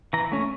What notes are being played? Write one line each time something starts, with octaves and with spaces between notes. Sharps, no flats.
E3 A#5
A3 C#4